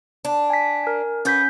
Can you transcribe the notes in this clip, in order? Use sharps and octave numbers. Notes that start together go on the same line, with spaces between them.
D4
G#5 B6
A#4 G#5
C#4 F#4 B4 G6 B6